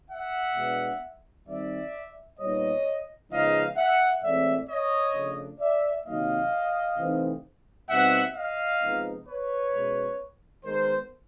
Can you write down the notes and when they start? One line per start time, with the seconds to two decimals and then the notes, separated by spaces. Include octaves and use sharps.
0.10 E5 F#5
0.56 B2 G#3 B3 D4
1.48 D#3 G3 C4 D#4 D5 E5
2.39 A#2 G3 B3 D#4 C#5 D#5
3.31 C#3 F3 G#3 B3 D#4 D#5 F5
3.77 E5 F#5
4.23 A2 E3 G#3 C4 D5 E5
4.69 C#5 D#5
5.14 C#3 F3 A3 D4
5.60 D5 E5
6.06 C3 D#3 F#3 A#3 D#4 D#5 F5
6.98 C3 E3 A3 C4 D#4
7.89 B2 G3 C4 D#4 E5 F#5
8.35 D#5 F5
8.81 C3 F3 G#3 B3 D#4
9.27 B4 C#5
9.73 B2 G#3 C#4
10.64 D#3 G#3 B3 A#4 C5